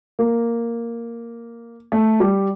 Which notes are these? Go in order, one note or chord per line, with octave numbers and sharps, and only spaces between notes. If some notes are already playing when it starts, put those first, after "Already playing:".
A#3
A3
G3